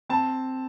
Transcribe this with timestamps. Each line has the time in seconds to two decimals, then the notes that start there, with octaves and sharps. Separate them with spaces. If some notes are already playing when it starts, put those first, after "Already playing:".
0.09 C4 A5